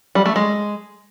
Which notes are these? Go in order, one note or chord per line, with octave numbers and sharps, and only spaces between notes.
G3
A3
G#3